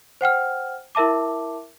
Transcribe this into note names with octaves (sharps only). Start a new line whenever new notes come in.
C5 F#5 G5 F6
E4 A#4 E5 A5 D6